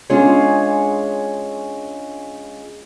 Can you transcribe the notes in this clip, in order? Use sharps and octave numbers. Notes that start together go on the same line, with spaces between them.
G#3 C#4 D4 F4 G#4 C#5